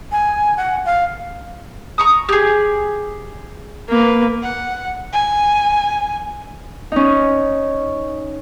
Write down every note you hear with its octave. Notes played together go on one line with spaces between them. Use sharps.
G#5
F#5
F5
A#5 C#6 D#6
G4 G#4
A#3 B4
F#5
G#5
C#4 D#4